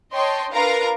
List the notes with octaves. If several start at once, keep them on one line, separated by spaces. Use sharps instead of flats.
C#5 D#5 G5 A5 C6
D4 F4 A#4 B4 F5 A#5